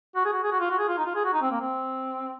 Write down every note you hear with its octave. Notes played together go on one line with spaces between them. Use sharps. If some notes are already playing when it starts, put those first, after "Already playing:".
F#4
G#4
F#4
G#4
F#4
F4
F#4
G#4
F4
D#4
F4
G#4
F#4
D#4
C4
A#3
C4